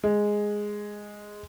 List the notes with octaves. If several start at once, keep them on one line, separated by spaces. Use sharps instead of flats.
G#3